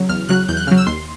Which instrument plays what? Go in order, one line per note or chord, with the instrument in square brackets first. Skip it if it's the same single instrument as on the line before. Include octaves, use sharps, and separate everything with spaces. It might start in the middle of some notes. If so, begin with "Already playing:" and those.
Already playing: [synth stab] C#3 F#3
E2 F6
C#3 F#3 F#6
E2 G6
F#6
C#3 F#3 F6
E6
D#2 C6